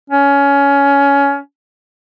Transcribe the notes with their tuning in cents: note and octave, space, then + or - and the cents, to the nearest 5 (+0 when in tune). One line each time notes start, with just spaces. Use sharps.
C#4 +20